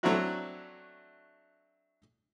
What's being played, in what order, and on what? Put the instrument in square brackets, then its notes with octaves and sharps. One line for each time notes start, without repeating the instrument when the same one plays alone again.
[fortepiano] F#3 A3 C4 D4 E4 F#4